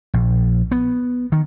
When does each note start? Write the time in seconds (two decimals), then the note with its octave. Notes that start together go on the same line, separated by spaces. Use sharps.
0.14 A#1
0.71 B3
1.32 D#3